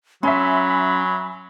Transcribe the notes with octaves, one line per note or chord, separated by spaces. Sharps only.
F#3 C#4 E5 G#5 B5 C6